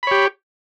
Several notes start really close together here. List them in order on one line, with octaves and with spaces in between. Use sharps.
B5 C#5 G4